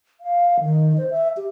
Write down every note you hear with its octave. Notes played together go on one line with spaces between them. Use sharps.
F5
D#3
C5
E5
G4